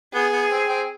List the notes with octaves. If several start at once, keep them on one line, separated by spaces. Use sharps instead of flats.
B3 G#4
B3
C4
C4